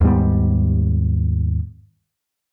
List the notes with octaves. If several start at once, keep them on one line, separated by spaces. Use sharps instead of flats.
D#2 G#2 G3 B3